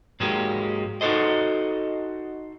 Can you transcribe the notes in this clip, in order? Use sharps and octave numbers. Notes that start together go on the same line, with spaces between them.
G#2 F#3 G#3 A#3 G4
D#4 F#4 A4 C5 D#5